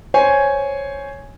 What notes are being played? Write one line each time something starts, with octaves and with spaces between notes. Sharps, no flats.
C5 C#5 G#5